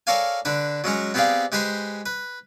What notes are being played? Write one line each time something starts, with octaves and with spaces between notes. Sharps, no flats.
A4 A#4 C#5 D5 F5 G#5
D3 D4 B4
F#3 G#3 C#4 C#5
B3 C4 G4 G#4 D5 F5
G#3 G4 B4 C5 G#5
B4